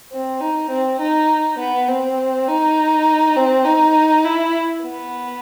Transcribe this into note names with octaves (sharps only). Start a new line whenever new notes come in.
C4
D#4
C4
D#4
B3
C4
D#4
C4
D#4
E4
B3